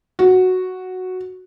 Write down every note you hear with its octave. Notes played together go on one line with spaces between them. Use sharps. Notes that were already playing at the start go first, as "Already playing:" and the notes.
F#4